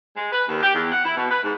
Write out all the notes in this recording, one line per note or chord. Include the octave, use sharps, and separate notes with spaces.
G#3
B4
D#2
G4
E2
F#5
E4
B2
B4
G#2